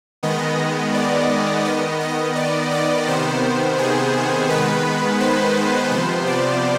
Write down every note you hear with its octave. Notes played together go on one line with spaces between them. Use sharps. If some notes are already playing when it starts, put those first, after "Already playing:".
D#3 G#3 B3 D#5
D5
D#3 B3 D#5
D#5
D5
D5
C3 D#3 B3 C5
G#4
D#3 G#3 B3 B4
C5
C3 F3 B3 C5
D5